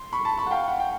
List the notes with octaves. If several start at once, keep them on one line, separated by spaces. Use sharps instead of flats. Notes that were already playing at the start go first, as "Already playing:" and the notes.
Already playing: C6
B5 C#6
A5 B5
B5 C#6
F#5
F5 G5
F#5
G5